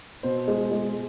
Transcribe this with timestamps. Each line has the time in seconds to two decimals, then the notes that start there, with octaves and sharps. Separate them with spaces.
0.23 B2 C5
0.48 G#3
0.71 G#3